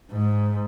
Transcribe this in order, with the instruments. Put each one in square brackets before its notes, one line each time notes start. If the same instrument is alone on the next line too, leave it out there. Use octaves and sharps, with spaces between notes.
[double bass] G#2